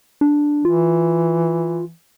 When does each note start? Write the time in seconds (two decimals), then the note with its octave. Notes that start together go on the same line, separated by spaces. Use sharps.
0.21 D4
0.65 E3 F4